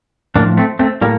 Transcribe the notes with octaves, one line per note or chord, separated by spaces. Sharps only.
A2 F3 A#3 D4
A3 C4
A3 C4
A2 G3 A#3